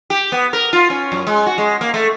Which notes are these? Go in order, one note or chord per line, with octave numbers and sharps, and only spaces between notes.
G4
B3
A#4
F4
C#4
F#2
G#3
F#4
G#3
A#3
A3